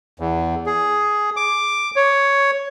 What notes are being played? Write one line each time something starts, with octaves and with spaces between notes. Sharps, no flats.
E2
G#4
D6
C#5